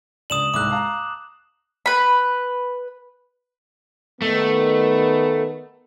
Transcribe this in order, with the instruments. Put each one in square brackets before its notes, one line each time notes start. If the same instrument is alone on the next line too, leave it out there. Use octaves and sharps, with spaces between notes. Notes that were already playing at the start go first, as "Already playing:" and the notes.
[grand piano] C#2 D4 [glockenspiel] D#6 E7 F#7
[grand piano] C2 G#2 E6 [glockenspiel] D6 F#6
[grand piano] F5 A5 A#5
[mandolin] B4 B5
[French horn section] D#3 B3 [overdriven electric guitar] A3